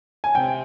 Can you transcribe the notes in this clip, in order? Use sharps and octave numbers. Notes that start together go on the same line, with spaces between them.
G#5
C3 G5